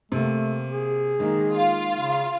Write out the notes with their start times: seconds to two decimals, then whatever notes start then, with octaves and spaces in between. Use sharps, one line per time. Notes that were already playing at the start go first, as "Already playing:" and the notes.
0.12 C3 A3 A#3
0.72 G#4
1.19 D#3 G#3 A#3 D#4
1.53 F4 F5
1.96 C#3